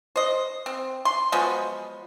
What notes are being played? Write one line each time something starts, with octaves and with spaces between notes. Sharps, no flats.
C5 D#5
C4
C6
F3 F#3 G#3 B3